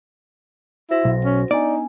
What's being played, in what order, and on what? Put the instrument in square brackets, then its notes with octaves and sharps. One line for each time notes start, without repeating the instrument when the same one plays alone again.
[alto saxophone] E4 [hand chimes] F#4 C5 A#6
[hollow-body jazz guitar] B1
[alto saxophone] C#4
[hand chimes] B3 D4 G#5 [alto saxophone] D#4 [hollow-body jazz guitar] D5